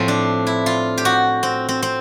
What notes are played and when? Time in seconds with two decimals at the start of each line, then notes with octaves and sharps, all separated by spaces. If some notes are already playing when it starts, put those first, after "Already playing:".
Already playing: A2 F3 C4
0.08 D4
0.47 E4
0.66 F4
0.98 G4
1.05 F#4
1.43 C4
1.69 C4
1.82 C4